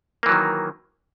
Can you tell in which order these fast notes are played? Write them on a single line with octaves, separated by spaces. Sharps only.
A#3 E3 F#3 D#3